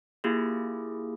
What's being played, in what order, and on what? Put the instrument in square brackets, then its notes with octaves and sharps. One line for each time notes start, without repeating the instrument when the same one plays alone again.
[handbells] A#3 E4 F4 G4 G#4